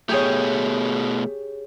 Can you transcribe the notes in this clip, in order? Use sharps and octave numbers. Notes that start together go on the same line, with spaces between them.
B2 A3 G4 G#4 C#5